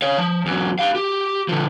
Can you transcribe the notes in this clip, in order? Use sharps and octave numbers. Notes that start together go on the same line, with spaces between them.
C#5 F5
F3
E2 F#3
G4 F5
G4
D3 F3